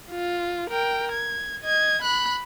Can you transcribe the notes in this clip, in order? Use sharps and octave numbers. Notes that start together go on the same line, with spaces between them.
F4
A#4 G5
G#6
D#5 G#6
B5 F#6